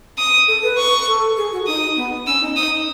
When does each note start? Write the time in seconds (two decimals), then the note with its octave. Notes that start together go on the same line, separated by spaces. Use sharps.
0.18 D#6
0.48 A4
0.63 B4
0.78 C#6
1.07 A4
1.37 G#4
1.52 F#4
1.67 D#4 D#6
1.96 B3
2.26 C#4 E6
2.41 D#4
2.56 D#4 D#6